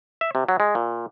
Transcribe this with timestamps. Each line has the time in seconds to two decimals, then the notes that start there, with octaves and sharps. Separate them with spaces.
0.21 E5
0.35 C3
0.48 F#3
0.60 G#3
0.75 A#2